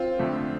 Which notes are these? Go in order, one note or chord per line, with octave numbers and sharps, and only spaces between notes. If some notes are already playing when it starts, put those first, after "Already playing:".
Already playing: C4 F4
F2 D3 F3 A3